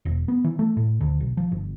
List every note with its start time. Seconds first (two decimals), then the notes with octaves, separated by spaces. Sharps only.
0.05 E1
0.28 B3
0.44 E3
0.59 A3
0.77 A2
1.01 D2
1.20 B1
1.37 F3
1.51 G1